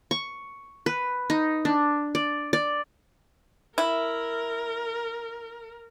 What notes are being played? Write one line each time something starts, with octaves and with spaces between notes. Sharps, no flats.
C#6
B4
D#4
D4
D5
D5
E4 A#4